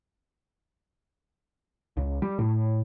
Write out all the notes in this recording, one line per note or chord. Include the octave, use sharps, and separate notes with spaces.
C#2
G3
A2